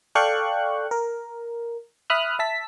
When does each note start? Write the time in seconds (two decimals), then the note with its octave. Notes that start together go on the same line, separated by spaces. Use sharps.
0.15 A4 D5 F5 G5 C#6 F#6
0.91 A#4
2.10 E5 B5 D#6 F6 F#6
2.39 E5 A5 B6